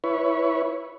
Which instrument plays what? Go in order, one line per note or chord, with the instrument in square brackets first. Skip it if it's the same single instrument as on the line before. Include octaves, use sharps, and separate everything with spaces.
[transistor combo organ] E4 B4 C#5